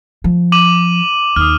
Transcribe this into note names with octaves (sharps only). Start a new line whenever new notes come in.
F3
D6 D#7 F#7
D#2 D#6 F6